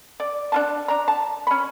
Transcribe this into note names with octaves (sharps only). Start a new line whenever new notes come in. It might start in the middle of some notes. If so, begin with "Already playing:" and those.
D5
D4 F4 A5
D4 A#5
A5
C#4 B5